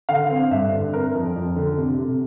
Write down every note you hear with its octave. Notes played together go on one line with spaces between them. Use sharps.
D3 F5
C4
G2 E5
D3
C4 A#4
F2
F2
D3
C3
C3